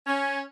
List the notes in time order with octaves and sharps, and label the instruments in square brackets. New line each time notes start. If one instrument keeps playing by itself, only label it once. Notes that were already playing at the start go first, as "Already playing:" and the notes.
[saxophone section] C#4